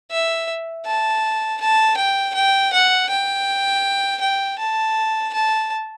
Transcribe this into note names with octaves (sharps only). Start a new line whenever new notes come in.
E5
A5
A5
G5
G5
F#5
G5
G5
A5
A5